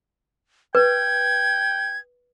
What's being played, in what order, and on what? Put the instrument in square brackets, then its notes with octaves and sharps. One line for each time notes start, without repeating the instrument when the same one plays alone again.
[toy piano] B4 [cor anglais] G5 [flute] G#6